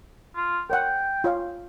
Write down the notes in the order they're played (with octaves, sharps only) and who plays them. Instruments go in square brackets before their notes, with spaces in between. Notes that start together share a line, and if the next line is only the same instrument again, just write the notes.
[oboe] F4
[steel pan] A#4 C#5 F#5 [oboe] G5
[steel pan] F4 C#5 F5